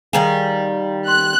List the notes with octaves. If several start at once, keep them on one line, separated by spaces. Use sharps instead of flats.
D#3 G3 G#4 F5 A#5
C6 F#6